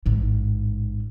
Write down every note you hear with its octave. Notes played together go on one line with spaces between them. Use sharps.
A1 G#2